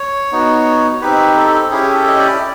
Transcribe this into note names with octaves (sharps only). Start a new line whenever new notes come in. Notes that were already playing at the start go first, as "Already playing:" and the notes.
Already playing: C#5
B3 D#4 F#4
C4 D#4 G4 B4
A4
C#4 E4 G4 G#4
A4
D#5
D5